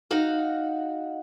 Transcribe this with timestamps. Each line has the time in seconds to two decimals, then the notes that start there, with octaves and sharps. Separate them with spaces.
0.11 D#4 F#4 F5